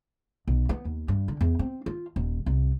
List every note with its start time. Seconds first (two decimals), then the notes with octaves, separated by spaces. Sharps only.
0.48 B1
0.69 B3
0.85 D#2
1.08 G2
1.28 D3
1.41 E2
1.59 C4
1.86 F4
2.16 D#1
2.46 C2